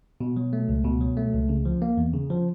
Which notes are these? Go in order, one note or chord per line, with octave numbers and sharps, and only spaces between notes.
B2
F#3
A3
C#2
B2
F#3
A3
C#2
C#3
F3
A#3
E2
C#3
F3